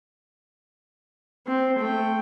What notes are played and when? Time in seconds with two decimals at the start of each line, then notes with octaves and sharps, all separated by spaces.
1.47 C4
1.79 A3 G5